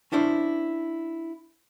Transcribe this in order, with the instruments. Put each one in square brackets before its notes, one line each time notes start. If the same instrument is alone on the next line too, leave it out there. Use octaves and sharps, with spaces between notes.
[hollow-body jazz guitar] C#4 D4 E4 C5